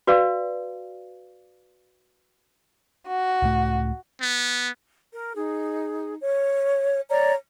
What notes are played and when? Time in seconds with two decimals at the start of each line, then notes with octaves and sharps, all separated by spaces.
0.07 F#4 B4 D5 F5
3.08 F#4
3.42 C#2 A2 A3
4.21 B3
5.13 A#4
5.35 D#4 G#4
6.20 C#5
7.09 C#5 D5 A#5